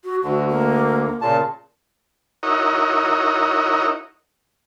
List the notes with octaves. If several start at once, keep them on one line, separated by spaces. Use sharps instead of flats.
F#4
D2 D3 F#4
A#3
A#2 C#3 A#4 A5
D#4 E4 F#4 A#4 C#5 D#5